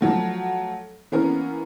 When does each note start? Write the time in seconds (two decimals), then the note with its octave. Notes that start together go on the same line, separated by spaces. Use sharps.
0.01 F3 F#3 A3
1.12 E3 A#3 B3 C#4 A#4